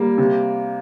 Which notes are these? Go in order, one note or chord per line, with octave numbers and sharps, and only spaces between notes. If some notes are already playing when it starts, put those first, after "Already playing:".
Already playing: G3 A#3
C3